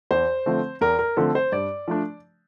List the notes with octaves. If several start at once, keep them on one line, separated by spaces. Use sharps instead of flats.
E2 C5
D3 F3 A3 C4
E2 A#4
A#4
D3 F3 A3 C4 A4
C5
G2 D5
F3 A3 D4